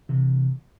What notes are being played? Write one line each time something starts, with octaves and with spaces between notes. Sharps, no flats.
C3 E3